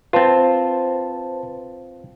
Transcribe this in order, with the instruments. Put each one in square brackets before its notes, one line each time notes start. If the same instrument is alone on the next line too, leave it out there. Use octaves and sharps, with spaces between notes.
[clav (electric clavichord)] C4 F4 [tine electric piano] B4 C5 A5